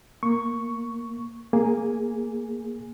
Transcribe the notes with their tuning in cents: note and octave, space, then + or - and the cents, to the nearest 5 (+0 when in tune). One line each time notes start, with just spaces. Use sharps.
A#3 +0 C#6 +0
A#3 +0 G#4 +0 G#5 +0